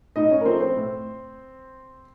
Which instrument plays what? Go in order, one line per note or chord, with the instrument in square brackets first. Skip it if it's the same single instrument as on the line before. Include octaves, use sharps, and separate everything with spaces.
[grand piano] A2 D#4 D#5
C#4 C#5
A#4
F3 A3 C4 C5
C4 C5
A2